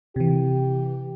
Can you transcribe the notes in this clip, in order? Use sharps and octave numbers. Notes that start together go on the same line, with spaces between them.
C3 E3 G4